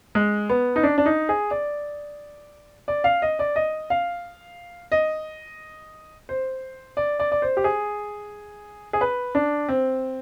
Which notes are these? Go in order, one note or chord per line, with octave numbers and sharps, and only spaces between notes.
G#3
B3
D#4
D4
D4
D#4
G#4
D5
D5
F5
D#5
D5
D#5
F5
D#5
C5
D5
D5
D5
C5
G4
G#4
G#4
B4
D4
C4